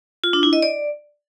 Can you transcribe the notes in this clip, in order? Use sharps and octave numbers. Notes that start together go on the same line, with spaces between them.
F4
D4
E4
D#5
D5